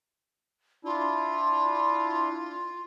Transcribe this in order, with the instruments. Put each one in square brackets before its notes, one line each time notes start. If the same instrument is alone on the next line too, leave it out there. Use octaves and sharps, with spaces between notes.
[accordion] D4 E4 [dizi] F4